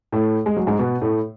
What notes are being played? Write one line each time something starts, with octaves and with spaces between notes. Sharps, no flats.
A2 A3
G#3
F#3
G#2 G#3
B2 B3
A2 A3